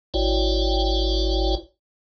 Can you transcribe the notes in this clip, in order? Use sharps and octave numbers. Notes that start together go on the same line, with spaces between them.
G#1 E4 F#4 C#5 D5 G5